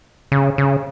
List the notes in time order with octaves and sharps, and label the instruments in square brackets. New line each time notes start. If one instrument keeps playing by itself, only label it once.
[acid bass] C#3
C#3